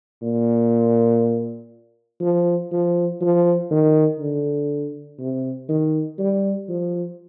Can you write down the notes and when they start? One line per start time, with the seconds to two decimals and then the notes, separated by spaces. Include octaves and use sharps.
0.22 A#2
2.21 F3
2.72 F3
3.21 F3
3.71 D#3
4.19 D3
5.19 C3
5.69 D#3
6.19 G3
6.69 F3